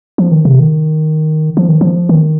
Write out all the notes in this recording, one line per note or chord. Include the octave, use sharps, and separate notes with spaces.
F3
D#3
C3
D#3
F3
D#3
F3
D#3